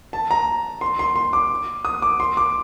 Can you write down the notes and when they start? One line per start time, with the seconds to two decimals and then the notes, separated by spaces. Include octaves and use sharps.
0.13 A5
0.31 A#5
0.81 C6
0.99 C6
1.16 C6
1.33 D6
1.85 D#6
2.02 D6
2.20 C6
2.37 D6